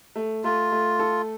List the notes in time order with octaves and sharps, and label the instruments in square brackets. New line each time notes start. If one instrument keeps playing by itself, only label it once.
[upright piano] A3
[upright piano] A3 [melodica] F4
[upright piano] A3
A4